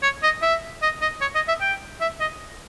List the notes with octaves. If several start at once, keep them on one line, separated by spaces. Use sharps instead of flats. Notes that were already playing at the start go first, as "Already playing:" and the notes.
C#5
D#5
E5
D#5
D#5
C#5
D#5
E5
G5
E5
D#5